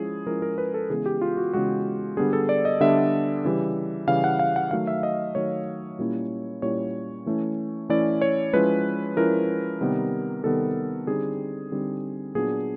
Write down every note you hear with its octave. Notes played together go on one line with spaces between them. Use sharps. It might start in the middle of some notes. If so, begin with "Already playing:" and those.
Already playing: F3 G#3 C#4 E4 G#4
F3 G#3 C#4 E4 A#4
A#4
B4
A4
C#3 E3 G#3 B3 G#4
G4
F4
F#4
C#3 E3 G#3 B3 F#4
D3 G3 B3 D4 G#4
A4
D5
D#5
D3 G3 B3 D4 E5
C#3 E3 G3
C#3 E3 G3 F5
F#5
F5
F#5
D#3 F#3 A3 F5
E5
D#5
D#3 F#3 A3 C#5
A#2 G3 A#3 C#4 E4
A#2 G3 A#3 C#4 E4 C#5
E3 A3 C#4 E4
E3 A3 C#4 E4 D5
C#5
F3 G#3 C#4 E4 B4
F3 G#3 C#4 E4 A#4
C3 D#3 G3 B3
C3 D#3 G3 B3 A4
D3 G3 C4 D#4 G#4
D3 G3 C4 D#4
A#2 F#3 B3 D4 G#4